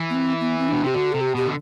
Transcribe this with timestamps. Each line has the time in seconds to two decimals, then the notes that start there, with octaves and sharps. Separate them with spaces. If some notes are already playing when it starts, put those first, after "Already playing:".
Already playing: E3
0.10 B3
0.14 C4
0.41 B3
0.59 C4
0.68 B2 D4
0.83 C3 G4
0.94 D3 F#4
1.12 C3 A4
1.21 G4
1.35 B2 G4
1.46 D3